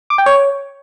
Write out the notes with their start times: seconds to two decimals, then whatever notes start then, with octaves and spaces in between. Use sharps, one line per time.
0.10 D6
0.18 G5
0.26 C#5